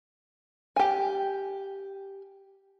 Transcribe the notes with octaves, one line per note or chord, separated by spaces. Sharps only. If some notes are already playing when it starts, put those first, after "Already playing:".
G4 G#5